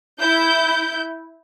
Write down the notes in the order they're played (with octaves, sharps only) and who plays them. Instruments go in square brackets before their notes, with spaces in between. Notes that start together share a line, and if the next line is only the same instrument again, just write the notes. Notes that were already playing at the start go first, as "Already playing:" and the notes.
[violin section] E4 G6